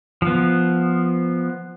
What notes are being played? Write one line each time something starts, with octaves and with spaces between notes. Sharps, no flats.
F3 B3